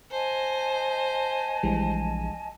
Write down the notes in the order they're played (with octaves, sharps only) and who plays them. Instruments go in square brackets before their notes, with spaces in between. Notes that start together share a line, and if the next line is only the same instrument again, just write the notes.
[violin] C5 [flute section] D#5 G#5 A5
[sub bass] A#1 [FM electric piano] E3 G3 G#3